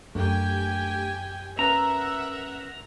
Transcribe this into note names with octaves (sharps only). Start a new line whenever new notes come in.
F#2 A3 D4 G4 A#4 G5 G#5
C#4 A#4 B4 E5 F#5 A#5